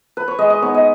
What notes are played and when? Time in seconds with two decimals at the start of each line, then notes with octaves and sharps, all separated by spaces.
0.17 B4
0.28 C#5
0.38 G#3 D#5
0.50 D#5
0.62 B3 D#4 C#5
0.74 D#5